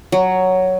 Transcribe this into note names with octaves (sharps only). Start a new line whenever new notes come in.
F#3